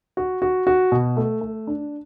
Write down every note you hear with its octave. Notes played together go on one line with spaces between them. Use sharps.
F#4
F#4
F#4
B2
A3
A3
D4